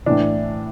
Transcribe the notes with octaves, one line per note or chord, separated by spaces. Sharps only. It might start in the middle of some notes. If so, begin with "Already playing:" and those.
A2 E3 D4